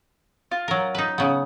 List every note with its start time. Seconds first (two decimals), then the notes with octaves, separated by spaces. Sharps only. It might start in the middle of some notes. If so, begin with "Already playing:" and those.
0.51 F4
0.68 F#3 A#4
0.95 D#4 B4
1.18 C#3 B3